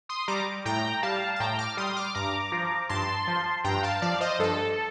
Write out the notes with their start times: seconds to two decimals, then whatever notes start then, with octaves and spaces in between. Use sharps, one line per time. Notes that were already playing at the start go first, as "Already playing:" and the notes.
0.09 C6 D#6
0.28 G3 A#5 D6
0.65 A2 G5 A#5
1.03 G3 F5 A5
1.36 A5
1.40 A2 G5 A#5
1.58 D6 F6
1.77 G3 C6 D#6
1.96 D6 F6
2.15 G2 A#5 D6
2.52 F3
2.89 G2 A5 C6
3.27 F3
3.64 G2 G5 A#5
3.83 F5 A5
4.02 F3 D5 F5
4.20 C5 D#5
4.39 G2 A4